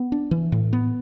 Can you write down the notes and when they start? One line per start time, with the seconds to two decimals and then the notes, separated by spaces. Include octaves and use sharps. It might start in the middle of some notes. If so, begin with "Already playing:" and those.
Already playing: B3
0.12 D4
0.31 E3
0.52 A2
0.73 B3